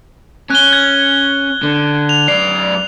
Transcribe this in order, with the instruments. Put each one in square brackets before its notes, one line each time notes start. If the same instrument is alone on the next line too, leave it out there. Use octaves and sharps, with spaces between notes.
[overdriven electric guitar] C#4 [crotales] F#6 G7
[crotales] G#6
[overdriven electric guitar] D3
[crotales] F7
[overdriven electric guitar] F#2 D5 [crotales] C7